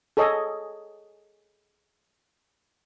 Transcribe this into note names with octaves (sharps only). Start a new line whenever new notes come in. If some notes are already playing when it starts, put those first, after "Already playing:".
G#4 A4 C#5 D#5